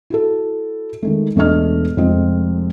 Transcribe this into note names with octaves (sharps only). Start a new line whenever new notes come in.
E4 F#4 A4
D#3 G#3 A3
E1 A3 D4 D#5 F6
F1 F2 G#3 C4 F4 D#5